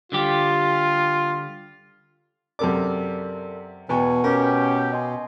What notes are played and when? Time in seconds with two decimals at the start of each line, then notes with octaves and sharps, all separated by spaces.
0.12 D3 G3 F4 G4
2.59 F#2 C3 A4 A#4 D5 D6
3.89 E2 B2 B4 G5 G#5 C#6
4.24 C#4 G4 A#4
4.93 D#5 G#5 C6